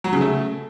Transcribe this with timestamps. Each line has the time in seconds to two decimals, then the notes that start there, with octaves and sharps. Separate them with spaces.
0.04 F#3
0.13 C#3
0.21 A3